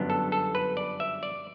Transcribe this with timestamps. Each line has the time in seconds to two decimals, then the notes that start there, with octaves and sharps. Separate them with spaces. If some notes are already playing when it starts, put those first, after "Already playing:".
Already playing: G1 F#2 F#3 B3 D4
0.10 A4
0.32 A4
0.55 B4
0.77 D5
1.00 E5
1.23 D5